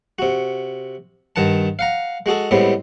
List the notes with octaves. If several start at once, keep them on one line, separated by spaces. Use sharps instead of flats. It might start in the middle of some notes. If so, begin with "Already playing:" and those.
C3 F#4
G2 D#3 F#5 A5
F5 F#5 A#5
G#3 F#4 G#4 A4
A2 G3 G#3 B3 C4